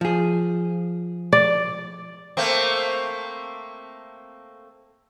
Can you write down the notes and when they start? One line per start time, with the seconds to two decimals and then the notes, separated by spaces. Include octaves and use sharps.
0.01 F3 G#4
1.33 D5
2.37 A3 A#3 C4